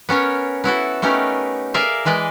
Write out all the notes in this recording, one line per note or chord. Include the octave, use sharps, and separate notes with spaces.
B3 C#4 A#4 C#5
B3 E4 F#4 A4
A3 B3 C#4 D#4 G4 A#4
G#4 A#4 D5 E5 F5
E3 G#3 B4 D5 D#5